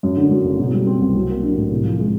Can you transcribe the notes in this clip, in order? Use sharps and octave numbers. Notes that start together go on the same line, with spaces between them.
F#2
D3
F#3
F#1
B2
G3
C4
C2
F#3
A#3
D4
A2
C3
F3
G#3